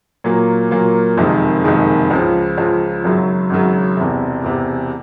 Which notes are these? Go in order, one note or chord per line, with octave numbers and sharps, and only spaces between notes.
A#2 F#3 A#3
A#2 F#3 A#3
F#1 F2 C3 D#3 G#3
F#1 F2 C3 D#3 G#3
C#2 C#3 F3
C#2 C#3 F3
G#1 F#2 C#3 F#3
G#1 F#2 C#3 F#3
E1 E2 C3
E1 E2 C3